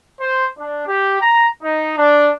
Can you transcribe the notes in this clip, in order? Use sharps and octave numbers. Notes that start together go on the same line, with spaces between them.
C5
D4
G4
A#5
D#4
D4